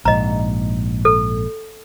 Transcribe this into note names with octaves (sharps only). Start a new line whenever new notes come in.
A#1 G#2 D#5 A#5
A4